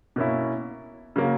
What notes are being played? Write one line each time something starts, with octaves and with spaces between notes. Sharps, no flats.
B2 A#3 C#4 E4
C#3 F#3 A#3